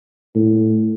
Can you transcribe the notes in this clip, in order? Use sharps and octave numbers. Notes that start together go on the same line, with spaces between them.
A2